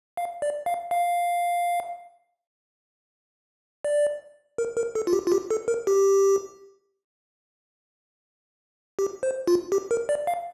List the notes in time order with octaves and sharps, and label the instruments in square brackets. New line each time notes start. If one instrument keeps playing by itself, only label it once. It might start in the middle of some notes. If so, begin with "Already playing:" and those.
[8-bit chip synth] F5
D5
F5
F5
D5
A#4
A#4
A4
F4
G4
F4
G4
A4
A#4
G4
G4
C5
F4
G4
A#4
D5
F5